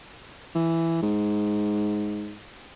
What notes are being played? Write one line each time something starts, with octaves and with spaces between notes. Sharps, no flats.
E3
G#2